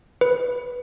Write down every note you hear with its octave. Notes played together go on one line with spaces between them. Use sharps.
B4